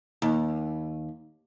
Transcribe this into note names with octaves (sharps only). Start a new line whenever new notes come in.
D#2